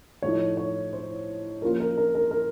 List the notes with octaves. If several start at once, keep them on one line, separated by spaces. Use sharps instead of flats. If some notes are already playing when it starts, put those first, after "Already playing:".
A2 F3 A3 D#4 C#5
C#5
C5
F3 A#3 C#4 F4 A#4
A#4
A#4
A#4
A#4